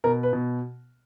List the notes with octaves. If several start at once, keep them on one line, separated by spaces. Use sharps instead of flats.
B2 A#4
B4
B2